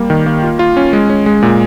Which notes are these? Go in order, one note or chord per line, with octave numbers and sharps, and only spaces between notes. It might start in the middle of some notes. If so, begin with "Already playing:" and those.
Already playing: G3 A#3
D#3
A#3
F4
F4
C#4
G#3
C#4
G#3
A#2